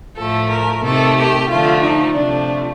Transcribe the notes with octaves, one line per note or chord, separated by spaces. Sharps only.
A2 F3 A3 A4
A#4
C3 D#3 A3 A4
G4
D3 F3 A3 F4
D#4
C3 F3 A3 D4